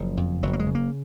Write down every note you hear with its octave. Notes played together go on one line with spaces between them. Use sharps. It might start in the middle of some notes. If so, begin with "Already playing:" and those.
Already playing: F#1 C#3 F3
F2
F#1 F#3
A#3
G#3
C#3
A#3